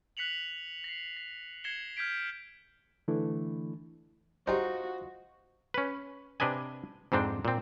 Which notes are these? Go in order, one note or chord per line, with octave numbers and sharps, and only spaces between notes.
F#6 B6 C#7 F7 F#7
A#6 C7
A#6
G#6 A#6 C7 C#7 E7 G7
F6 G6 G#6 B6 D7
D3 E3 A3 D4 E4
G3 G#3 D#4 F4 F#4 C5
C#4 B4
C3 D4 B4 D#5 G#5
F2 G#2 C4 D4 G5
A#2 C4